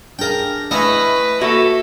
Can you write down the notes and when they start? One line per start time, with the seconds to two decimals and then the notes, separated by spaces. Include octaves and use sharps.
0.19 D4 G#4 A#4 F5 G5
0.71 A3 E4 B4 D#5 F5 G#5
1.41 A#3 F#4 A4 E5